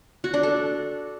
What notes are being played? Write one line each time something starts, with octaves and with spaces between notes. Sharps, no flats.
F#4
D4
A4